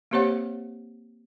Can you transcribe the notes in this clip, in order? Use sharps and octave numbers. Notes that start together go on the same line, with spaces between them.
A#3 C4 G4 C5 C#5 F#5